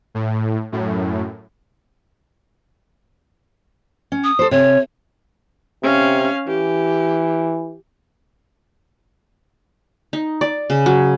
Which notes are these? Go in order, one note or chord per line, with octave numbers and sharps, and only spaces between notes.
A2
F#2 A2
C#4
D#6
A4 C5
C3 C#5
C3 C#4 F5
E3 G4
D#4
D5
C#3
F#3